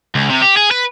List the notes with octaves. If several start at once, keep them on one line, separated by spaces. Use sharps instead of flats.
C#2
C3
G4
G#4
B4